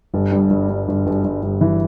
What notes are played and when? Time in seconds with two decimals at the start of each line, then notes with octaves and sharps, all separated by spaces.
0.14 G1
0.32 G2
0.50 G1
0.69 G2
0.88 G1
1.06 G1
1.24 G1
1.43 G1
1.61 E3